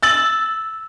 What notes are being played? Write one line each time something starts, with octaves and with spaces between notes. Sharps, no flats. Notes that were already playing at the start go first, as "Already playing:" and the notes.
E6 A6 F#7